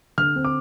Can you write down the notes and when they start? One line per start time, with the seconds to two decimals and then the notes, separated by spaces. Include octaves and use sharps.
0.18 D3 F6
0.36 C4
0.45 D6